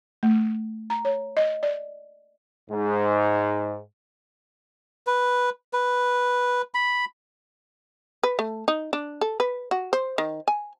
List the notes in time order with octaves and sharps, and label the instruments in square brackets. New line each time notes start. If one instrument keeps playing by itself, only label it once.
[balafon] A3
A#5
C#5
D#5
D5
[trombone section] G#2
[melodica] B4
B4
B5
[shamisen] B4
A3
D#4
D4
A4
B4
F#4
C5
D#3
G#5